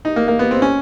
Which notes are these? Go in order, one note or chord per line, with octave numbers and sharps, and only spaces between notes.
D#4
A#3
A#3
B3
C4
C#4